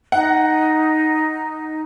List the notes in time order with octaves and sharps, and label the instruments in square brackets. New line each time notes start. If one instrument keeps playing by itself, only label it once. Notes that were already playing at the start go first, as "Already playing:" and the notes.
[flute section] D#4 [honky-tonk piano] F#5